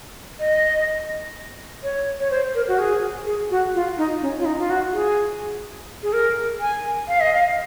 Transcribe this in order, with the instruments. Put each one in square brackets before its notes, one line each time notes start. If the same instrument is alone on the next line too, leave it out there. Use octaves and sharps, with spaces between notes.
[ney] D#5
C#5
C#5
C5
A#4
F#4
G#4
G#4
F#4
F4
D#4
C#4
F4
D#4
F4
F#4
G#4
G#4
A#4
G#5
F5
D#5
F5